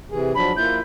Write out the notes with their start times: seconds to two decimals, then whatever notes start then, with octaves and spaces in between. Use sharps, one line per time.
0.11 C3 E3 G#4
0.34 F3 F#3 D4 B5
0.56 A#3 E4 F4 G6